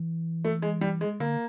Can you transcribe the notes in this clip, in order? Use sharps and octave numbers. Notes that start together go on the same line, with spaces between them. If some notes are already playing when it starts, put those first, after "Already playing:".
Already playing: E3
A3
G#3
G3
G#3
D3 A#3